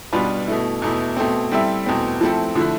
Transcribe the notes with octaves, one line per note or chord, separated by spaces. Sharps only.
B2 G3 D4 F4 B4
B2 A3 E4
E2 B2 A3 E4
B2 A3 C4
G3 C4 E4 A4 E5
E2 B2 A3 C4
F3 A3 C4 E4 A4
D3 F3 A3 E4